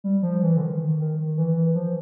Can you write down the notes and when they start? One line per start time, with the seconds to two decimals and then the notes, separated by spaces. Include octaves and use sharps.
0.04 G3
0.23 F3
0.42 E3
0.57 D3
0.61 D#3
0.99 D#3
1.37 E3
1.57 E3
1.75 F3